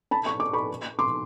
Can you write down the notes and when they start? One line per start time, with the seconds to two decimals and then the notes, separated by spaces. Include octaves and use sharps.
0.11 A5 B5
0.26 C#6
0.40 D6
0.53 B5 C#6
0.99 C6 D6